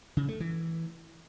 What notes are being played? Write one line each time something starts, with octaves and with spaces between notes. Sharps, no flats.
C#3
A3
E3